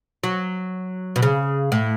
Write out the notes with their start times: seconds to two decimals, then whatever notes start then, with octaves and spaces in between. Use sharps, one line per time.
0.24 F#3
1.16 B2
1.22 C#3
1.72 A2